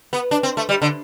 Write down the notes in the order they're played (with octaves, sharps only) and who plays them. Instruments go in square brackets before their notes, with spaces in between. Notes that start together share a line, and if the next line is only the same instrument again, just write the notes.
[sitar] B3
D4
C4
A3
G3
D3